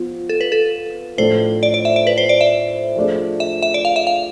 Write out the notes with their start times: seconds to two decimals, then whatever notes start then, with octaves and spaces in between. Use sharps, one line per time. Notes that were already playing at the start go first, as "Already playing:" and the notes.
Already playing: F3 B3 F4
0.29 A4
0.41 B4
0.52 A4
1.18 A2 F3 A3 D4 A4 C5
1.63 D5
1.74 D5
1.85 E5
1.96 D5
2.07 B4
2.18 C5
2.29 D5
2.41 E5
2.96 F3 A3 D4 G#4
3.40 E5
3.62 E5
3.74 D5
3.85 F5
3.96 E5
4.07 F5